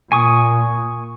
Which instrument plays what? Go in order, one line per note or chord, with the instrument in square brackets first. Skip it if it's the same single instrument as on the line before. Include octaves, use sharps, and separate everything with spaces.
[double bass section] A#2 [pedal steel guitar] G#5 C#6 D#6